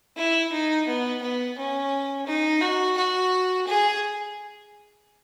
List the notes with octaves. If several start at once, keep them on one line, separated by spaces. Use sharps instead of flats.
E4
D#4
B3
B3
C#4
D#4
F#4
F#4
G#4